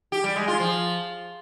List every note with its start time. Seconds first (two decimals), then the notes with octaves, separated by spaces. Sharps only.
0.12 G4
0.24 G3
0.36 G#3
0.48 F4
0.60 F3